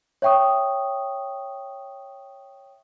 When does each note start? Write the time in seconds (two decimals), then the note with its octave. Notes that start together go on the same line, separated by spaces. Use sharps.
0.22 C#5 E5 G5 C#6 D#6